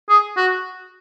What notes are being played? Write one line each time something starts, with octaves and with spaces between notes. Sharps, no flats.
G#4
F#4